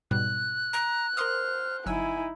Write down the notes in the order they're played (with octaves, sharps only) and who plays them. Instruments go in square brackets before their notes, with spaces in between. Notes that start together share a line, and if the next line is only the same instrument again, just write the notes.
[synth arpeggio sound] G#2 B2 G3 [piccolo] F#6
[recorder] A#5
[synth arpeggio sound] A#4 C6 D#6 [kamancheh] C5 [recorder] F6
[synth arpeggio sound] G1 F#3 E6 [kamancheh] D#4 E4 [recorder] G#5